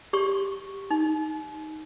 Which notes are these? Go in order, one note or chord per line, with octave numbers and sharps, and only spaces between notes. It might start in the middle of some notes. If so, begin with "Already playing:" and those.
G4 C6 C#6
D#4